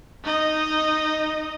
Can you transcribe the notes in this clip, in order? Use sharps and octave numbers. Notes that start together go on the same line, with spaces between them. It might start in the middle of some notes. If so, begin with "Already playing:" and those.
D#4 D#5